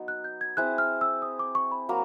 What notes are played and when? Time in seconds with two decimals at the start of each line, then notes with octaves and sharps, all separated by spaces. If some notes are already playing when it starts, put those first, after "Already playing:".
Already playing: F#3 B3 D#4
0.08 F#6
0.24 G6
0.41 G#6
0.57 C4 E4 G#4 C5 F#6
0.78 F6
1.01 E6
1.22 D#6
1.39 D6
1.55 C#6
1.72 B5
1.89 F#3 A#3